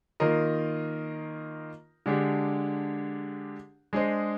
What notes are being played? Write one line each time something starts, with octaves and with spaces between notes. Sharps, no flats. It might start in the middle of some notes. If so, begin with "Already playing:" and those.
D#3 A#3 F4 A#4 D#5
D3 G#3 D4 G4
G#3 D4 G#4 C5 D#5